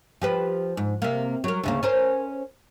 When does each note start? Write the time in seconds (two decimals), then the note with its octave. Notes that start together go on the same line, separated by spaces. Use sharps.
0.22 F3 G4 B4
0.77 G#2
1.02 C3 A#3
1.44 F#3 A#4
1.63 D2 C#3 A#3
1.83 C#4 A#4 C5